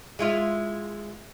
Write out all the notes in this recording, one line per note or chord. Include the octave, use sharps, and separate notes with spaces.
G#3 E4 F4